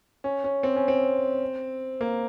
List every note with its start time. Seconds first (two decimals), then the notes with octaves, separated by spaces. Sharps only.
0.24 C#4
0.44 C#4
0.63 C4
0.76 C#4
0.88 C4
2.01 A#3